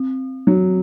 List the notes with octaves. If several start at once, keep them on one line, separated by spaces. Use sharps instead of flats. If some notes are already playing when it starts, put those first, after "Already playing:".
Already playing: C4
F#3